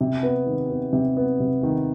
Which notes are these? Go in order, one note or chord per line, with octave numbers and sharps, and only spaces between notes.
C3
B3
D#3
B3
C3
B3
C3
D#3